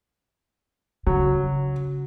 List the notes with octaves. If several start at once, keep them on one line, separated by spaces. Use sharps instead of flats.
C#3 F#3